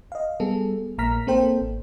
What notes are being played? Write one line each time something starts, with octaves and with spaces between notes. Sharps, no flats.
D#5 F5
G3 B3 G#4 A4
A#1 A#3 A#5 F6 B6
A#3 C4 A4 C5 G5
G#1